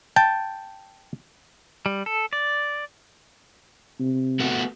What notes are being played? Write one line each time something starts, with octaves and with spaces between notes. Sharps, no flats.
G5 A5
G3
A4
D5
C3
A3 B3 F#4